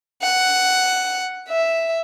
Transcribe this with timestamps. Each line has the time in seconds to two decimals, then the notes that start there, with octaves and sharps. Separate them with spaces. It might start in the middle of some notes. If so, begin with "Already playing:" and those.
0.23 F#5
1.49 E5